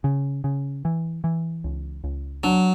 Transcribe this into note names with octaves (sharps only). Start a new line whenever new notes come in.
C#3
C#3
E3
E3
C#2
C#2
F#3 D4